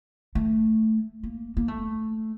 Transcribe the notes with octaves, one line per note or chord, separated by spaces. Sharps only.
A3
A#3
A#3
A3